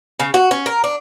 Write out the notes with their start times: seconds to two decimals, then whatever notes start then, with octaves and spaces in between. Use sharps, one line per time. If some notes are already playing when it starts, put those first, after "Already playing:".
0.20 C#3
0.34 F#4
0.51 C#4
0.66 A#4
0.84 D4